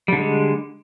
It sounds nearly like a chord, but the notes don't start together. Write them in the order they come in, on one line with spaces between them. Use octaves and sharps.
G3 D3 G#3